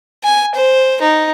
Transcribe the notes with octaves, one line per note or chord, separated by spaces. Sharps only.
G#5
C5
D#4